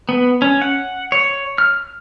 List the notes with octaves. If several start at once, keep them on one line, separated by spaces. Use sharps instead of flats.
B3
C#4
F#5
C#5
F6